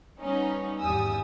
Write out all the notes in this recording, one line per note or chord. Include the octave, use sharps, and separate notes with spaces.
G3 B3 C#4 D#4
G#1 E2 G3 G#5 D#6 E6